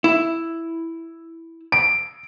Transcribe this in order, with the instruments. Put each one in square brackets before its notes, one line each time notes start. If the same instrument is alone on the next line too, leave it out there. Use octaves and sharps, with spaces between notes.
[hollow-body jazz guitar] E4
[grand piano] D7